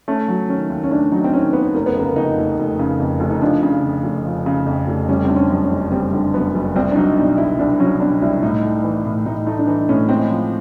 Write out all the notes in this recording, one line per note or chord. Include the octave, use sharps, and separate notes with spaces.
A3 C#4
F#3
D#3 C#4
D#2
C#4
A3 D4
F#3 D#4
C4
D#3 C#4
D#2 B3
F1 A#3
B3
C#3 A#3
F2 D#4
F1
F1
C#3
F2
F1
D#4
F3 D4
C#3
F2
F1
F3
C#3
F2
F1
G3 C#4
D3 C4
C#4
F#2
C#4
F#1
G3 C4
D3
F#2 B3
F#1
C2 C4
D4
F#3 D#4
B2 D4
C2 E4
C2 D4
F#3 C#4
B2 D4
C2 E4
A2 D#4
A3
E3
A2
A2 D#4
A3 D#4
D4
E3 D#4
A2 C#4
G#3 C4
F3